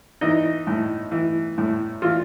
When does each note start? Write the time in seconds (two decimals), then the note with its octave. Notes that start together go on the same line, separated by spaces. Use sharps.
0.21 E3 D#4
0.67 A2
1.12 E3
1.58 A2
2.02 E3 F4